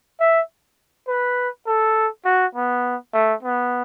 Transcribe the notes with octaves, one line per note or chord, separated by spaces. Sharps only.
E5
B4
A4
F#4
B3
A3
B3